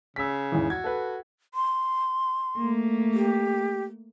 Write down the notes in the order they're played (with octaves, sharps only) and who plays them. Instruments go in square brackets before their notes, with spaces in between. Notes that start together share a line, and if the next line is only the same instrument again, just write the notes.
[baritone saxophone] C#3 [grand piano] E6 B6
[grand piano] E2 G#2 E3
[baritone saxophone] F#4 [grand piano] G#6
[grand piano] A4 B4
[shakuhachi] C6
[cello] A3 A#3
[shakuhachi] G4